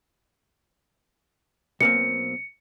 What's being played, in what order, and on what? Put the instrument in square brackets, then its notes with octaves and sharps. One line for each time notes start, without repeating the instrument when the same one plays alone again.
[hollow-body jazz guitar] B1 A#3 C4 [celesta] C#7